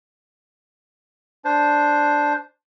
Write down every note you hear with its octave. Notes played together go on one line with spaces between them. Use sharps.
D4 C5